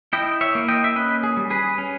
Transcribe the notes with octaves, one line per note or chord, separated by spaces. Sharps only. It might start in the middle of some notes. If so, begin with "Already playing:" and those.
E4 D#5 G5
C#5 E5
A#3
D#5 G5
E5
C#4 B4 D#5
G#4
G3
G#4 B4
C#4